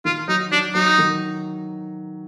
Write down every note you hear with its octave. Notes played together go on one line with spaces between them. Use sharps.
D#3 F4
F#3 D#4
F#3 D4
F#3 D#4
D#3